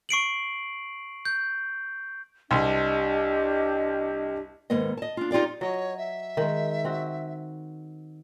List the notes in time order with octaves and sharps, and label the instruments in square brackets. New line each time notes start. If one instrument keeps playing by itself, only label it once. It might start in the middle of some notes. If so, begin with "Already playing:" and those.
[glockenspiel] C#6 C7 D7 F#7
G6
[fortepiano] C2 C6 [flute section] D4 G4 D#5
[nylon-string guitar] D#2 G#2 A#3 B3 D#5
D#5 A5
D4 F4
D#4 F4 G4 D5 F5
[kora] F#3 D#5 [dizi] C#5
[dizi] E5
[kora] D#3 G#3
C4 F#4